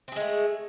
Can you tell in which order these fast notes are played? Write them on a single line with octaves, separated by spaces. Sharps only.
C4 G#4 G#3 A3